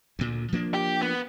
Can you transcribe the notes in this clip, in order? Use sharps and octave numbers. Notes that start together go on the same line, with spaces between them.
D2 A#2
F3 A#3 D4
G4
B3